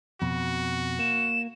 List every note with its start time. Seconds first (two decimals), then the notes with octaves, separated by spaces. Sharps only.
0.22 F2 B2 F#4
0.99 A#3 E7